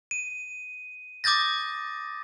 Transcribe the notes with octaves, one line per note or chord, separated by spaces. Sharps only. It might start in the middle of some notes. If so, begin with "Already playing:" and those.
D#7
D6 D#6 G6 A6 A#6